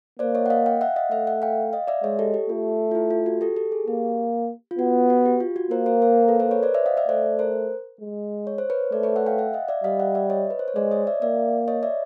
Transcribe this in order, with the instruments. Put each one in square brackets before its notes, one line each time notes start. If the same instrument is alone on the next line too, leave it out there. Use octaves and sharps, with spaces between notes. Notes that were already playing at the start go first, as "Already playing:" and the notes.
[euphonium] A#3 [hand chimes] C5 D5
[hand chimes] C#5 D#5
F#5
D#5 F5
F5 G5
E5 F#5
D#5 F5
[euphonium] A3 [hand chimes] E5 F#5
[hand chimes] E5 F#5
F5 G5
D#5 F5
D5 E5
[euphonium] G#3 [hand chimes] C#5 D#5
[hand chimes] G4 A4
G4
[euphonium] A3 [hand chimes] F4
[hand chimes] F4
E4
F4
F#4
G4 A4
G4 A4
G#4
[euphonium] A#3 [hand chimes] G4
[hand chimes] F4
[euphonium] B3 [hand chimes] F#4
[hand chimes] F#4
G4
F4
F#4
[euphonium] A#3 [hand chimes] A#4 C5
[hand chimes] A#4 C5
A#4 C5
A4 B4
A#4 C5
B4 C#5
C5 D5
D5 E5
D#5 F5
D5 E5
[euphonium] A3 [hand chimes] C5 D5
[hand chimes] A#4 C5
[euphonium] G#3
[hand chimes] C#5
C5
B4 C#5
[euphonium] A3 [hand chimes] C5 D5
[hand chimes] B4 C#5
E5 F#5
F5 G5
E5 F#5
D#5 F5
D5 E5
[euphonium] G3 [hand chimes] D#5 F5
[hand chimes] E5 F#5
D5 E5
C#5 D#5
B4
C5
C#5
[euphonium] G#3 [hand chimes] C5 D5
[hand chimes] C#5 D#5
D5 E5
[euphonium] A#3 [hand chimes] D5 E5
[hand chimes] C#5 D#5
D5 E5